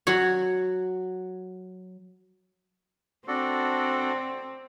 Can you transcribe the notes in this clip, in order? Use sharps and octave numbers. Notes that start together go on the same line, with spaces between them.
F#3 F#4 C#5
C4 D4 F#4 A4